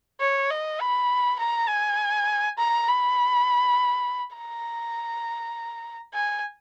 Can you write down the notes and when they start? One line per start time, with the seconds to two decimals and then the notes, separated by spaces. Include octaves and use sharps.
0.21 C#5
0.50 D#5
0.80 B5
1.39 A#5
1.68 G#5
2.58 A#5
2.87 B5
4.36 A#5
6.14 G#5